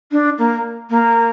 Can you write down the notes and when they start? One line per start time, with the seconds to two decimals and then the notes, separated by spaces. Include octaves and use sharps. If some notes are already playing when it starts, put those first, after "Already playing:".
0.11 D4
0.38 A#3
0.89 A#3